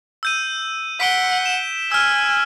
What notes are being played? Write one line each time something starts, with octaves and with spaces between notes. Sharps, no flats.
E6 G6 D#7
F#5 B6 D7 G7
E7
G#5 E6 F6